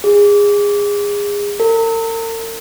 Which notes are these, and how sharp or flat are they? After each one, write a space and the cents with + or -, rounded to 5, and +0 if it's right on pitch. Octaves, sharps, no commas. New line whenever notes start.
G#4 -25
A#4 -45